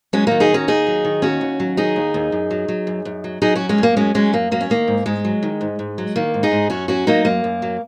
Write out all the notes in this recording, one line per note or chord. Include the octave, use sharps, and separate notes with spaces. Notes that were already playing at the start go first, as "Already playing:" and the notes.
F#3 G#3 C#4
D#3 A#3 D#4
D#4 G#4
D#2 C#4 F#4
D#2 D#4 G#4
F#3
D#3
D#2 C#4 F#4
D#2
F#3
D#3 D#4 G#4
D#2
D#2
F#2
F#3
F#3
F#2
F#2
F#3
F#3 D#4 G#4
F#2 C#4 F#4
G#3 C#4
F#2 A#3
F#3 G#3 C#4
F#3 G#3 C#4
F#2 A#3
F#3 A#3
C#4
D#3 A#3
G#2
G#2 G#3
F#3
D#3
G#2
G#2
F#3
D#3 A#3
G#2
D#4 G#4
G#2
F#2 C#4 F#4
F#3 C#4 F#4
F#3 A#3 D#4
F#2 A#3
F#2
F#3